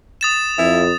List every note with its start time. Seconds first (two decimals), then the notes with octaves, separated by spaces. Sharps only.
0.21 D#6 A6 E7
0.59 F2 E4